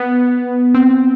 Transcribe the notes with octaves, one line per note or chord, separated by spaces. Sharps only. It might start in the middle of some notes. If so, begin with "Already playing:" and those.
Already playing: B3
C4